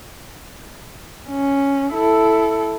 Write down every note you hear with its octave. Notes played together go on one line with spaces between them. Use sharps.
C#4
E4 A4